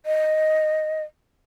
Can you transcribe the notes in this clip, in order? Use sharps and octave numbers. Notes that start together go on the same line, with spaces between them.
D#5